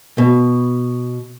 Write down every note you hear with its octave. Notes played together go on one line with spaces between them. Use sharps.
B2